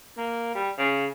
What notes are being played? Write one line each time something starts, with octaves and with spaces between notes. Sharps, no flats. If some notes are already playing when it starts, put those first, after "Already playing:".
A#3
G3
C#3